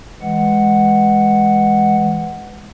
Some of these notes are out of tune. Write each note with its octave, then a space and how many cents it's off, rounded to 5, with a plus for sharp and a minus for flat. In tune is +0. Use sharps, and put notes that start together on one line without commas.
E3 +0 G#3 +0 F#5 +0